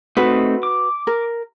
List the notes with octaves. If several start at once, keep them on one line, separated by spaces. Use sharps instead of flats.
A3 C4 D#4 F#4 B4
D6
A#4